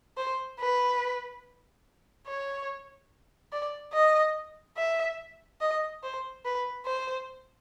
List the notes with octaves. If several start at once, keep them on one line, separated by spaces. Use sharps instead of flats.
C5
B4
C#5
D5
D#5
E5
D#5
C5
B4
C5